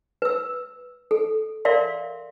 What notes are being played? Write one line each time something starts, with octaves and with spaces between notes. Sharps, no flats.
B4 E6
A4
A#4 D5 E5 F5 C6